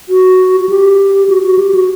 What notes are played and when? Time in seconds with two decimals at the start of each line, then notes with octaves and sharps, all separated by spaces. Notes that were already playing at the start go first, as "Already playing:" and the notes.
0.09 F#4
0.60 F#4
0.69 G4
1.29 F#4
1.43 F#4
1.59 G4
1.74 F#4